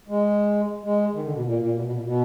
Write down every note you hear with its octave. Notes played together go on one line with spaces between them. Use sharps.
G#3
G#3
D#3
D3
B2
A#2
A#2
B2
B2
A#2
B2